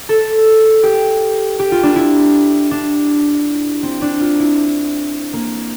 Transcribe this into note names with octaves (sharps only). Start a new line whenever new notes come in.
A4
G4
G4
F4
D4
E4
D4
C4
D4
F4
E4
A#3